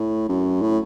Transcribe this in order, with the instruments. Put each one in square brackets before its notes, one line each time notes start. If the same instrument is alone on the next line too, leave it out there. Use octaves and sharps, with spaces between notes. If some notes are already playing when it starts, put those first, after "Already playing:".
Already playing: [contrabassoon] A2
F#2
A2